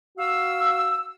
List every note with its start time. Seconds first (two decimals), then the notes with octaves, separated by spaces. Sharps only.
0.18 F#4 F5 E6